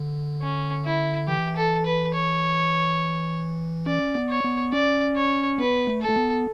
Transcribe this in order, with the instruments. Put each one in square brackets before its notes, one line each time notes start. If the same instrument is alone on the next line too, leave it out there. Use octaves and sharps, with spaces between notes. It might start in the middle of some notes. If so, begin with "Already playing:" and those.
Already playing: [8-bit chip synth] D3
[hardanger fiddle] C#4
E4
[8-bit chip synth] E3 [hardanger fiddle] G4
[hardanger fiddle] A4
B4
C#5
[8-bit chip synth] C#4 [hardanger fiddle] D5
[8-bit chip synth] B3
[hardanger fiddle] C#5
[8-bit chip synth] B3
[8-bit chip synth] C#4 [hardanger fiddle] D5
[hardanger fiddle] C#5
[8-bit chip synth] B3 [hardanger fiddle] B4
[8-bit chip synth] A3
[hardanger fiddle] A4
[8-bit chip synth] A3
B3